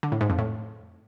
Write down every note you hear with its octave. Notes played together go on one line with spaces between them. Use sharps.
D3
A2
G#2
F2
A2